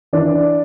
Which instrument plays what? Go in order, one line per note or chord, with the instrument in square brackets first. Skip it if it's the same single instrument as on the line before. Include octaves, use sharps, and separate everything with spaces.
[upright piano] E3 D4